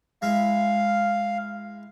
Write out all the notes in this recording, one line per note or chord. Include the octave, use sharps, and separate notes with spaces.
G#3 E4 F5